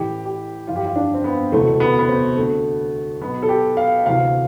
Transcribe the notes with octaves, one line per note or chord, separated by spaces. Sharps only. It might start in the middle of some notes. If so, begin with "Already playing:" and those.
Already playing: A1 A2 E3 G4
G4
G1 F2 E3 F4
G4
F4
D4
C4
B3
E1 D2 C3 E3 A3
B3
B3
C4
D2 D3 A3
B1 B2 B3
A4
G4
F5
D2 C3 E3 F5